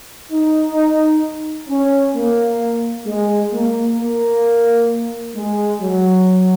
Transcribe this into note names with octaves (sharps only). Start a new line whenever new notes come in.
D#4
C#4
A#3
G#3
A#3
A#3
G#3
F#3